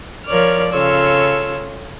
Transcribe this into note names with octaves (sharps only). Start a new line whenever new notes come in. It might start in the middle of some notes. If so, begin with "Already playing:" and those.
F3 A#4 C#5 D5 F6
C#3 F4 A4 C#5 E6